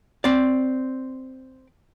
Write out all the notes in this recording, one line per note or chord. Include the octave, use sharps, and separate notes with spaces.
C4 D5